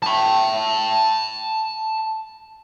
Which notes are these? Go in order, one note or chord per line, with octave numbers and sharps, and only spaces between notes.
A5 B5